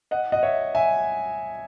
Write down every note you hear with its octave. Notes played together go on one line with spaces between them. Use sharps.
D#5 F#5
D#5 F#5
C#5 E5
E5 G#5